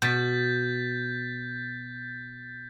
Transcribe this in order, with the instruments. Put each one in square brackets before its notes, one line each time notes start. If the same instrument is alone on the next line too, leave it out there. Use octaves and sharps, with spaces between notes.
[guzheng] B2 [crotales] G6 A6 B6